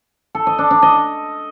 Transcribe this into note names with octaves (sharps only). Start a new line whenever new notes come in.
A4
D#5
D4
D4
D#5